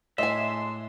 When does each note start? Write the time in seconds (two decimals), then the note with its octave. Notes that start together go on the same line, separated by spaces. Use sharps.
0.18 A2 G#3 D4 D#5 E5 G#5 C6